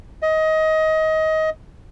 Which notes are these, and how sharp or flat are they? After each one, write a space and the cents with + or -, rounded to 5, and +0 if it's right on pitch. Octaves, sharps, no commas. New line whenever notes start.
D#5 +20